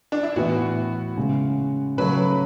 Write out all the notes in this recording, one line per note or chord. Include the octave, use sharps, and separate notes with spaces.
D4
E4
A2 E3 B3 E4 F#4
C#3 G#3 B3 E4
C#3 F#3 A3 B4